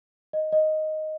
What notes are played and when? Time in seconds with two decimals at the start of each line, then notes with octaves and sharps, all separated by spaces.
0.33 D#5
0.52 D#5